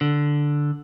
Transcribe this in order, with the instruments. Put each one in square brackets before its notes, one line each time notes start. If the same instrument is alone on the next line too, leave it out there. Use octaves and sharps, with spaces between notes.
[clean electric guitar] D3